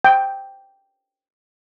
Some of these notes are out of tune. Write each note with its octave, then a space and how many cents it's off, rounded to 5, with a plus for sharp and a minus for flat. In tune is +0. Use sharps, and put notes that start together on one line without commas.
G5 +0